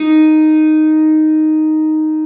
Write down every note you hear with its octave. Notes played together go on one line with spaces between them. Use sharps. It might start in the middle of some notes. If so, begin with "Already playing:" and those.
Already playing: D#4